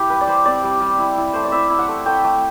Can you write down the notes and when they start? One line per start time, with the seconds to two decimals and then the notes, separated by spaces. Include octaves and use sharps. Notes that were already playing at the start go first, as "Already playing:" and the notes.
Already playing: E4 G4
0.10 G3 B4
0.21 D5
0.27 G3 C5
0.46 C4 D5
0.64 G3
0.81 G3
0.99 E4
1.17 E4
1.33 A3 C5
1.44 D5
1.52 E4 E5
1.70 E4
1.79 F#5
1.88 A3
2.06 A3 G5
2.24 A3